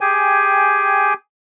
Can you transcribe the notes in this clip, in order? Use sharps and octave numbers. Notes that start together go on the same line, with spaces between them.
G4 G#4 G5 G#5